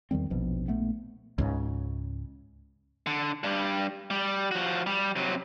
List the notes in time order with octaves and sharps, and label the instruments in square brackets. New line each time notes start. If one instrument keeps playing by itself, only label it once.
[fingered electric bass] E2 D#3 G3 C4
D#1 A#1 B2 F3
A#1 A3 B3
[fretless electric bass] C#2 G#2 C#3
[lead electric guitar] D3
G2 G3
G3
F3 F#4
G3
C3 F#3